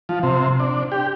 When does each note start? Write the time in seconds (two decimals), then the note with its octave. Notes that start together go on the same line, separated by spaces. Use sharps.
0.09 F3
0.23 C3
0.60 D4
0.92 G4